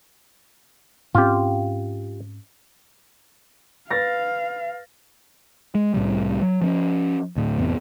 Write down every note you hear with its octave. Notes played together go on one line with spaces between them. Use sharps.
G#2 C4 C#4 F4 G4
B4 F5 A6 A#6
G#3
C2 A2 C3 G3
F#3
F3 C4 C#4
D2 A2
A1 F2 C3 B3